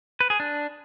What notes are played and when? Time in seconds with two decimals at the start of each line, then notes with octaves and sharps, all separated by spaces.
0.20 B4
0.30 G#4
0.40 D4